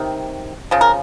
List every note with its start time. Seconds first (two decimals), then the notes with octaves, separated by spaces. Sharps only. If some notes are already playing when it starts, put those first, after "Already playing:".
Already playing: C3 D#3
0.71 C#3 F3
0.81 A#4